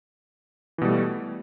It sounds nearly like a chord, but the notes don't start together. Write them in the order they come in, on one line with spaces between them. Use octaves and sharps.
E3 B2 G3 A3